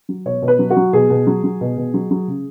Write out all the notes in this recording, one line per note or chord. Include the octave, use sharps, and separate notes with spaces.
F#3
B2 C#5
B2
B4
F#3
F#4
F#3
B2 G#4
B2
F#3
F#3
B2
B2
F#3
F#3
C#3